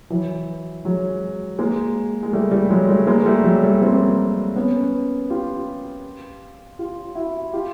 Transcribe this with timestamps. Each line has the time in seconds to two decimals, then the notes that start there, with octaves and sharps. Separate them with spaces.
0.10 E3 F#3
0.85 F#3 G#3
1.59 G#3 A#3
2.23 G#3
2.33 G3 A3
2.51 G3 A3
2.70 F#3 G#3
2.89 G3 A3
3.07 G#3 A#3
3.26 G3 A3
3.44 F#3 G#3
3.63 G3 A3
3.81 A#3 C4
4.56 B3 C#4
5.30 F4 G4
6.79 F4 G4
7.15 E4 F#4
7.53 F4 G4